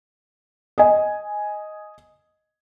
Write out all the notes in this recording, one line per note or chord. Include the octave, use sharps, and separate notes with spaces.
D#5 G#5